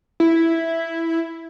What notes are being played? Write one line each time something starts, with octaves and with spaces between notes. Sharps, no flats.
E4